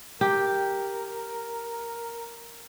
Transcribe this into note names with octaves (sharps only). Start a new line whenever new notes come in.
G4 A#4